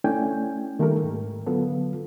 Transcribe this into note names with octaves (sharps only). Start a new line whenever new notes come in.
A3 C#4 D4 E4 G5 G#5
D#3 G3 A3 A#3 A4 A#4
G#2
D3 F#3 B3 F4 A4